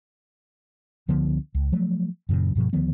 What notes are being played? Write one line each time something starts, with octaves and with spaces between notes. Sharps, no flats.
C#2 D3 F3 B3
C#2
F3 F#3 A3
F#2 A#2 C#3 F#3
G2 B2 F3
D2 D#3 F3 B3